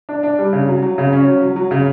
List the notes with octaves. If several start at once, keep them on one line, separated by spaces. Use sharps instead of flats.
D4
D4
G3
C#3
F#3
F#3
C#3
C#4
F#3
F#3
F#3
C#3